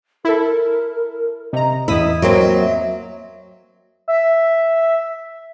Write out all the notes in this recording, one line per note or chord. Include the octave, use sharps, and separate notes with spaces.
E4 A4 A#4
C3 D#5 A#5
E2 E4 D#5 D#6 B6
F#3 A#3 C4
E5
E5